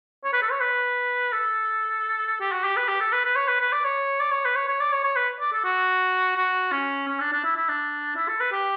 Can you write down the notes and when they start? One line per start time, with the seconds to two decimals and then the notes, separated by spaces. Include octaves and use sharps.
0.24 C#5
0.33 B4
0.42 A4
0.51 C#5
0.60 B4
1.32 A4
2.40 G4
2.52 F#4
2.64 G4
2.76 B4
2.88 G4
3.00 A4
3.12 B4
3.25 B4
3.36 C#5
3.48 B4
3.60 B4
3.72 D5
3.85 C#5
4.20 D5
4.32 C#5
4.45 B4
4.56 C#5
4.69 C#5
4.81 D5
4.93 C#5
5.04 C#5
5.16 B4
5.40 D5
5.52 A4
5.64 F#4
6.37 F#4
6.72 C#4
7.08 C#4
7.20 D4
7.32 D4
7.44 E4
7.57 E4
7.69 D4
8.16 E4
8.28 A4
8.40 B4
8.52 G4